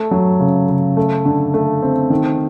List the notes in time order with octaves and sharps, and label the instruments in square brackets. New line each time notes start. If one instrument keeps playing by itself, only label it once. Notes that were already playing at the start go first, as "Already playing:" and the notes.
Already playing: [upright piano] A3
F#3
C#3
C#3
A3
D3
A3
C4
D#3